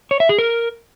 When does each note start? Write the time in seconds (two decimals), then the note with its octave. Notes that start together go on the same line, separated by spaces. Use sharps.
0.11 C#5
0.20 E5
0.29 G#4
0.39 A#4